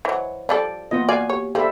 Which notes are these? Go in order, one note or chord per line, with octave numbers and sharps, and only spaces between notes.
E3 F#3 C5 C#5 D#5
F3 G3 A4 D5
A#3 B3 F4 D#5 A#6
F#4 D5 F5 G#5
G4 C#5
F3 G4 A4 D5 E5 B5